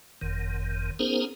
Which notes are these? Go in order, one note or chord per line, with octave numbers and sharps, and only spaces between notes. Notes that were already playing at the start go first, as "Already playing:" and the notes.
F#1 F2 D#3
B3 C#4 D#4 G#4 A#4 C5